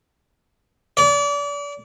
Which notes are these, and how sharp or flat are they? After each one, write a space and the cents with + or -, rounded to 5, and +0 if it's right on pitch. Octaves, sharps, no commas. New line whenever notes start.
D5 -35